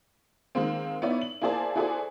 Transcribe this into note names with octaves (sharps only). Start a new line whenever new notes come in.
D#3 G#3 A#3 C4
B3 D#4 E4 C#5 D5 E5
F#7
A#3 E4 G#4 C5 D5 A5
E4 F#4 G#4 A4 C5 D5